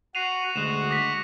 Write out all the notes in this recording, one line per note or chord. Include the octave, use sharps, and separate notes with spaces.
F#4 C7 D#7 F7
D2 G#3 F#4 E7 F7
D6 A#6 B6